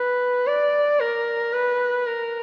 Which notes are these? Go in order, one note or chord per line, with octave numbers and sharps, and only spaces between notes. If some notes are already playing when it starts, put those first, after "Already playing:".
Already playing: B4
D5
A#4
B4
A#4